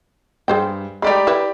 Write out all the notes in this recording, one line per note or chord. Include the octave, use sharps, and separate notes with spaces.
G2 G#4 C5 G5
G#3 A3 D#4 G4 D5 B5
E4 B4